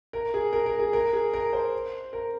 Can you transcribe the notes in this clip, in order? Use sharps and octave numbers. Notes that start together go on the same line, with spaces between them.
A#4
G#4
A#4
A#4
G#4
A#4
G#4
A#4
C5
A#4